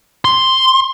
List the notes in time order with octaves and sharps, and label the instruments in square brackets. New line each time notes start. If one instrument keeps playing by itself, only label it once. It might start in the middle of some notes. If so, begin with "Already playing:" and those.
[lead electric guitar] C6